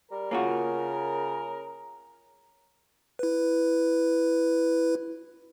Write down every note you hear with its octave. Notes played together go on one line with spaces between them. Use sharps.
G3 A#4
C#3 A#3 F4 F#4
E4 B4